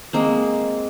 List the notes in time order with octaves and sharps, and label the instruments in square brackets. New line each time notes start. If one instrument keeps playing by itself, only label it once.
[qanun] G#3 A#3 C4